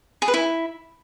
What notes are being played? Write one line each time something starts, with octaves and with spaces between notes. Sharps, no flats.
G#4
B4
E4